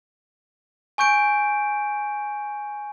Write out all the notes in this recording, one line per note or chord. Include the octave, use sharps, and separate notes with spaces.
G#5 C#6 G6 D7